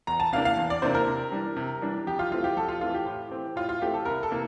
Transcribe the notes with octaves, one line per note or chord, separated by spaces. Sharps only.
E2 A#5
A5
C3 E3 A#3 D4 F5
F5
E2
D5
C3 E3 A#3 D4 C5
A#4
C3
E3 G3 D4
C3
E3 G3 D4
F2 G4
F4
E3 A3 C4 F4
G4
F2 A4
F4
E3 A3 C4 F4
G4
A2
E3 A3 C4
A2 F4
F4
E3 A3 C4 G4
A4
C2 A#4
A4
C3 E3 A#3